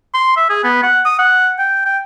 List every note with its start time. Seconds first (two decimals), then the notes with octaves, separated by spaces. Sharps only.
0.14 C6
0.37 E5
0.50 G#4
0.64 B3
0.83 F#5
1.05 D#6
1.19 F#5
1.59 G5
1.86 G5